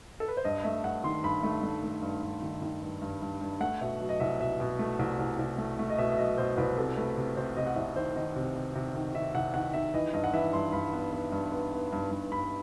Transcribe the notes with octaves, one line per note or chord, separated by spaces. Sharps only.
A4
B4
C5
G2 D#5
A3 E5
G2 F#5
D#3 C6
G2 B5
A3
A3
A3
G2
G2
D#3
D#3
G2
G2
G2
G2
A3 F#5
B2 E5
F#3
D#5
C2 E5
B2 E5
B2
A3
C2
C2
C2
A3
A3
D#5
B2 E5
E5
F#3 D#5
B2 C5
C2 B4
C3 A4
A3 B4
C3
C3 C5
C3 D#5
F#5
C2 E5
D#3 C5
D#3 D#5
C3
C3
C3
D#3
D#3 E5
C2 F#5
D#3 F#5
D#3 E5
E3 D#5
G2 D#5
F#5
E3 E5
G2 C6
G2 B5
B3
B3
G2
B3
B3
G2
G2
G2 B5